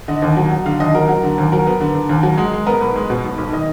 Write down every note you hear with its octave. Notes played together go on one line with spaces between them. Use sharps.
D3 D#5
D#2
F#3
F#3
D3 F5
D#2 D#5
F#3 A#4
F#3
D3
D#2
F#3 A#4
B3
D3
D3
D#2
F#3
G#3
G#3
B3 A#4
B1 B4
G#3
B2
B1
B1
D#3 D#5